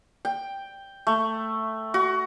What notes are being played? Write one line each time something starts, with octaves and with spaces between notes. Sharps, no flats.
G5
A3
F#4